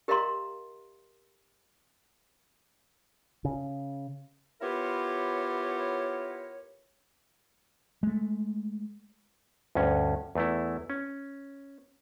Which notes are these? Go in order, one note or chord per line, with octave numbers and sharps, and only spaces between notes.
G4 A#4 D#5 F5 A#5 C6
C#3
B3 E4 F4 G4 A#4 C#5
G#3 A3
D2 G2 C#4
E2 A3 E4
C#4